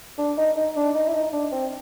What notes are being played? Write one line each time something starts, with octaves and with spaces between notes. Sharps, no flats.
D4
D#4
D#4
D4
D#4
E4
D#4
D4
C4